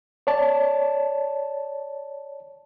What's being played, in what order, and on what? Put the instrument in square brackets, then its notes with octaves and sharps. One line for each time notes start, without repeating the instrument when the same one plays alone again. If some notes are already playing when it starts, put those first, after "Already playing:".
[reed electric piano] C#5 D5 A5